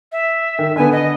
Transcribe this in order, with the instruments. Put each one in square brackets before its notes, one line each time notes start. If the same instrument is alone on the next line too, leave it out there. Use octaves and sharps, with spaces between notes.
[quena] E5
[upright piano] D#3
[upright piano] D3 B3 [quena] G#5
[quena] D#5